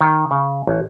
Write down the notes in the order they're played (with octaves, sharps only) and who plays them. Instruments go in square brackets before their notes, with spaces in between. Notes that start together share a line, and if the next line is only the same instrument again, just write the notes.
[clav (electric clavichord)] D#3
C#3
A1